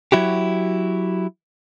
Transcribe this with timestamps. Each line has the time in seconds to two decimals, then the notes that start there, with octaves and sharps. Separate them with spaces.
0.12 F#3 E4 F#4 G4